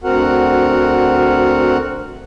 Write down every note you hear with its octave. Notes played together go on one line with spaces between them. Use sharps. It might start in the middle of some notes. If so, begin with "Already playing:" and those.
D2 C4 F#4 A#4 F#5